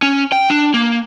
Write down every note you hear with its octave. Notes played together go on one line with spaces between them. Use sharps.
C#4
G5
D4
A#3